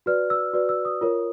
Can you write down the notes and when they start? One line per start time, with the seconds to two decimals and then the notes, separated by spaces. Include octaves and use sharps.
0.06 F#4 B4 D5 F6
0.30 E6
0.53 F#4 B4 D5
0.69 E6
0.85 D#6
1.01 F4 A#4 C#5